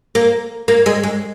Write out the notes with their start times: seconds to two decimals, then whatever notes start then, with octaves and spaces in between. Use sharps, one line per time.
0.15 A#3
0.68 A#3
0.86 G#3
1.03 G#3